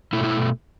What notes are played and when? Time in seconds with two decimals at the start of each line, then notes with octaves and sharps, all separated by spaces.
0.13 B2 A3 E4
0.24 E4